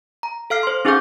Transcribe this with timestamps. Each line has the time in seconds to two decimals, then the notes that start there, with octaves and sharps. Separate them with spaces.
0.23 A#5
0.50 A4 F5 F6 C7
0.63 C5 C6
0.85 C#4 D#4 G#4 F5 D6 G6